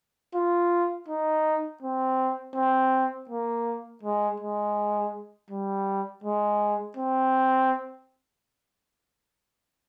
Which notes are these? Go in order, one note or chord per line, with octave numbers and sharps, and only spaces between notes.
F4
D#4
C4
C4
A#3
G#3
G#3
G3
G#3
C4